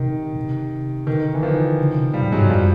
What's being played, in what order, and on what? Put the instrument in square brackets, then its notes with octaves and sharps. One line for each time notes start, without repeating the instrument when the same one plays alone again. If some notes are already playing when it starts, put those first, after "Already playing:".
Already playing: [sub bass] C3 [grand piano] D#3
[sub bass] C3
[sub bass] D3 [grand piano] D#3
[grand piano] E3
D#3 F3
[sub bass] C#3
C3
[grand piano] F3 G3
[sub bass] A2
[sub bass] G#2 [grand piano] F#3 G#3
[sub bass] G2
[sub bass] F#2 [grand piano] F3 G3